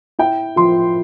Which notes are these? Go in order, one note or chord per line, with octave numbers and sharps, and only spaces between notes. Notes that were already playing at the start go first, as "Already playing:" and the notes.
E4 G5
F3 C6